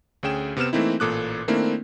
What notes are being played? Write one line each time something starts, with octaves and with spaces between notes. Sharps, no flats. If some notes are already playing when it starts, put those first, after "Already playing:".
D2 C#4 G#4 G5 E7
C3 B3 C4 F6 E7
E3 A3 A#3 C4 D#4 E4
A1 A#2 A4 D6 D#6 F#6
D#3 A3 A#3 C4 D4 E4